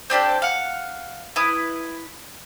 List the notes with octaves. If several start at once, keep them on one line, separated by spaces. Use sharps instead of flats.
C4 D4 G4 A4
F5 F#5
E4 B4 D#6